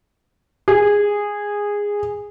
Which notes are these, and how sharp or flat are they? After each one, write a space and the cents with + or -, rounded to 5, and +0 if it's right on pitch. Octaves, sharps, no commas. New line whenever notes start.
G#4 -15